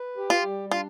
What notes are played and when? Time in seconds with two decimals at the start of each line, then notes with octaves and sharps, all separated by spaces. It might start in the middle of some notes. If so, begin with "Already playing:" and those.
Already playing: B4
0.17 G4
0.30 F4
0.43 G3
0.72 D4 F4